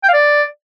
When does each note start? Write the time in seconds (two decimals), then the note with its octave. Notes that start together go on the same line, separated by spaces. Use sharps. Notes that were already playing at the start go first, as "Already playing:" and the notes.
0.03 G5
0.09 F5
0.14 D5